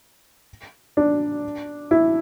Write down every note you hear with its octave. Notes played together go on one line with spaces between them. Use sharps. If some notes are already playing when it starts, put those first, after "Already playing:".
D4
E4